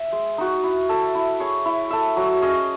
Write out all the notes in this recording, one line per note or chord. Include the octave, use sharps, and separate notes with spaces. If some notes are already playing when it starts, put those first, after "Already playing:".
Already playing: E5
G#3
D#4 F#4
E4
A4 E5
E4
G#4 C#5
E4
A4 E5
F#3
C#4 G#4 D#5